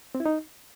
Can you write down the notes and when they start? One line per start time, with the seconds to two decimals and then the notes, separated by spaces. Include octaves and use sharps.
0.15 C4
0.20 E4
0.26 D#4